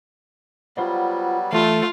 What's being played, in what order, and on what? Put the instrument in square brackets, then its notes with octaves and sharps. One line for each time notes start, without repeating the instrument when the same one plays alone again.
[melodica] F#3 G3 B3 [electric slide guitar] F4 C5 D5
[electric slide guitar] E3 [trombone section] A3 [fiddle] F4